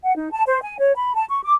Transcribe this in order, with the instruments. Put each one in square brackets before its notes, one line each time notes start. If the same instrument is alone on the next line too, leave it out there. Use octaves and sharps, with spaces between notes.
[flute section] F#5
D#4
A5
C5
G#5
C#5
B5
A5
C#6
D6